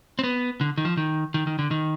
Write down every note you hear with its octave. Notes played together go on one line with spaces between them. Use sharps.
C4
B3
D3
D#3
F3
D#3
D#3
D#3
D3
D#3